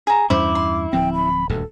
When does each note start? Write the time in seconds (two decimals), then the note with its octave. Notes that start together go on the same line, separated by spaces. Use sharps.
0.07 G#4 A#5
0.30 E2 G2 C#4 E4 C5 D6
0.55 C6
0.93 D1 F3 C4 G5
1.14 B5
1.50 D#1 D2 G2 A4